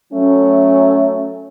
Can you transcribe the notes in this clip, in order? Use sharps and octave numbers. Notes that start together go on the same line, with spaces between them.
F#3 A3 C#4